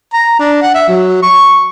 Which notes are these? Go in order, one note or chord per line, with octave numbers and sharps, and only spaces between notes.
A#5
D4
F#5
E5
F#3
C#6